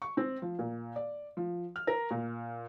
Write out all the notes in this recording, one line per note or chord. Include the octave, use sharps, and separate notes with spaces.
C#6
C4
F3
A#2
D5
F3
F6
A#4
A#2